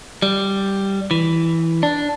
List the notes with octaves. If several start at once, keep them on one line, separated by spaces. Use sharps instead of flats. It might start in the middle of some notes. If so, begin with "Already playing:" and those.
G3
E3
D4